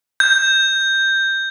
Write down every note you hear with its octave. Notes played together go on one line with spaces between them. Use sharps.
G6